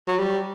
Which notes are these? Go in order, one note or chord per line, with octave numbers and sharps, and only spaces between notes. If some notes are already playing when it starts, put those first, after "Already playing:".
F#3
G3